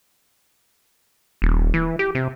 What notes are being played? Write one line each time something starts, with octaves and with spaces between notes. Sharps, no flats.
D#1
E3
G4
C3